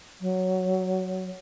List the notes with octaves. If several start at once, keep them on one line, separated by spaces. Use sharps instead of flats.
F#3